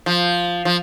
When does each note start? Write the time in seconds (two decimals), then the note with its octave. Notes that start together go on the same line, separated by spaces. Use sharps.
0.06 F3
0.65 F3